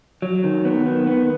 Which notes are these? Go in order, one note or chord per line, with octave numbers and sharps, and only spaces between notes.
F#3
D#3
B3
D#3
B3